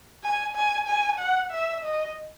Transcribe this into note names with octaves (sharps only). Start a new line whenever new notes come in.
G#5
G#5
G#5
F#5
E5
D#5